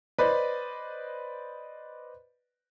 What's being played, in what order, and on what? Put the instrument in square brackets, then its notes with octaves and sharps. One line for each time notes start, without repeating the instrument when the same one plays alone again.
[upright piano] B4 C5 D5 D#5 B5